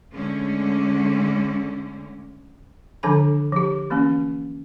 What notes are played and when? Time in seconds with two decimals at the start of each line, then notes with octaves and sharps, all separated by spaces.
0.13 D3 G#3 A3 C#4
3.03 D3 D#3 F3 D4 G#5 B5
3.52 F3 G4
3.90 E3 A#3 B3 C#4